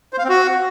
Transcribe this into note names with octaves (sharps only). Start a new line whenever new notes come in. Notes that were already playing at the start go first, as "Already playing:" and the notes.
C5
F5
C4
F#4